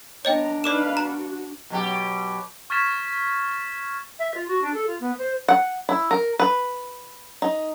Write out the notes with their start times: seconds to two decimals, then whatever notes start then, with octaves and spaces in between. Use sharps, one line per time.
0.25 B3 D4 C#5 D#5 G5 A#5
0.64 D#4 B4 D5 F5 D6 E7
0.97 F#4 A#5
1.70 B2 F#3 G4
2.70 C#6 F6 G#6 A6 B6 E7
4.19 E5
4.34 F4
4.48 F#4
4.61 D4
4.73 A4
4.87 F4
5.00 B3
5.18 C5
5.48 F#5
5.89 E4
6.11 A#4
6.39 B4
7.42 D#4